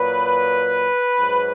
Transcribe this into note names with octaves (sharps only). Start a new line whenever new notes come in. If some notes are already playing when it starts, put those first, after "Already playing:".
Already playing: A#2 F#3 B4
G#2 F#3